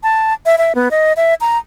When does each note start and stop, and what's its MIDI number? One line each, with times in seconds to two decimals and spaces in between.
0.03 0.34 81
0.46 0.56 76
0.58 0.73 76
0.75 0.89 59
0.91 1.13 75
1.17 1.34 76
1.41 1.58 82